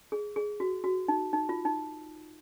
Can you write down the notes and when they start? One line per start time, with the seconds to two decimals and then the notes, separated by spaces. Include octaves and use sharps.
0.12 G#4
0.36 G#4
0.60 F#4
0.84 F#4
1.08 D#4
1.33 D#4
1.49 F4
1.65 D#4